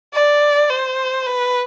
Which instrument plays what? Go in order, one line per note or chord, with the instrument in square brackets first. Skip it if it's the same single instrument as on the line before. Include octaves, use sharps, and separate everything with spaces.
[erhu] D5
C5
B4